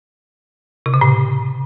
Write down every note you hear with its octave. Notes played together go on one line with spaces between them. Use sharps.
C3
C#3
A2